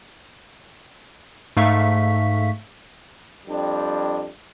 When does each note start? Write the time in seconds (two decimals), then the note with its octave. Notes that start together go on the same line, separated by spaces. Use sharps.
1.57 G#2 A3 F5 C#6 B6
3.47 F2 G3 D4